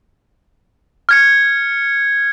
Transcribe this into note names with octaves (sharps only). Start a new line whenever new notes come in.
F6 G#6 C#7